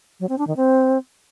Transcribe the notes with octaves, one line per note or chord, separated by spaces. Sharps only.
F#3
C4
D4
D#3
C4